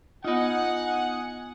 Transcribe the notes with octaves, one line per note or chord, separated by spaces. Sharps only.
B3 D#4 F4 D#5 F#5 G#5